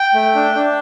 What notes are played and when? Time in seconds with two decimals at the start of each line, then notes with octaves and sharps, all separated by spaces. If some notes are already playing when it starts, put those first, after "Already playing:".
Already playing: G5
0.14 A3
0.35 D4
0.55 D4